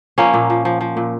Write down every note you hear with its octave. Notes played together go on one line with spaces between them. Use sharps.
F3 A#3 C#4
A#2
F3
F3
F3
A#2